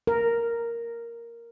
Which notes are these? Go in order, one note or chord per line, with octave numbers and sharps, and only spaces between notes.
A#4